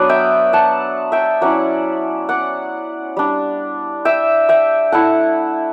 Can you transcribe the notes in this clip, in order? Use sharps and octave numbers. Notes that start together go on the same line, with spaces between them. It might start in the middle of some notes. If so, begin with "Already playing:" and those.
Already playing: F#3 B3 D4 B4 D5
E5 G5
F#5 A5
E5 G5
F#3 C#4 E4 D5 F#5
D5 F#5
G3 D4
E5 G5
E5 G5
A3 E4 F#5 A5